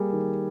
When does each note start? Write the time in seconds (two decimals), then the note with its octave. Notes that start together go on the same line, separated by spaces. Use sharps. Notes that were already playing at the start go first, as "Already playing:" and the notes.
Already playing: G3 A#3 G#4
0.13 D#3